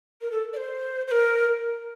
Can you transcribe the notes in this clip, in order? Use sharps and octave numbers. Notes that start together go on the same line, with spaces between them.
A#4
A4
D5
C5
C5
A#4